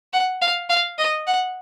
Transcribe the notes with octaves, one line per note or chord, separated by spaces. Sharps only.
F#5
F5
F5
D#5
F#5